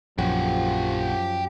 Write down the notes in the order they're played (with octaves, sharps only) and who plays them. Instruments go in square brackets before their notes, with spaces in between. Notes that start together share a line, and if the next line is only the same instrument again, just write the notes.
[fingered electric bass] A#1 [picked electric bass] F#2 [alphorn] F3 [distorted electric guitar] G4 F#5